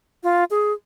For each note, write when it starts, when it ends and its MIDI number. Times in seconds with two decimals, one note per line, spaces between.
0.23 0.44 65
0.50 0.72 68